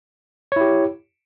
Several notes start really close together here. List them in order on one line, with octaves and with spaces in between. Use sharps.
C#5 E4 G4